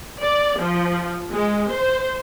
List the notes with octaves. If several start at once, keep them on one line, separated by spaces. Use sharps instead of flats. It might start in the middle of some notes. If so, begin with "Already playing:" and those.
D5
F3
G#3
C5